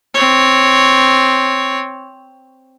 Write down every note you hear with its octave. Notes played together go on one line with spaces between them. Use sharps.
C4 C#5